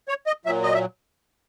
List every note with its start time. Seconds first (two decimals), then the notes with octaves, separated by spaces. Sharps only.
0.08 C#5
0.27 D#5
0.46 A#2 F#3 E5
0.63 D#5
0.74 E5